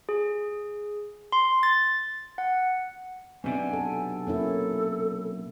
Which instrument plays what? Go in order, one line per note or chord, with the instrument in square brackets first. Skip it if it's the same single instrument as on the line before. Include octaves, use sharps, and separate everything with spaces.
[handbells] G#4
C6
A6
F#5
[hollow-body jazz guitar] B1 C3 D4 [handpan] B3 [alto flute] G#5
[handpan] A4
[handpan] A#3 C#4 E4 [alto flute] A4